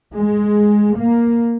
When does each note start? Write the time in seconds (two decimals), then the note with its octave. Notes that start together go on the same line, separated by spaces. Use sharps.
0.14 G#3
0.96 A#3